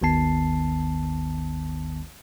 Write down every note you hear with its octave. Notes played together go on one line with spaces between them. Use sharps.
G#1 D#2 D#3 B3 A5 C7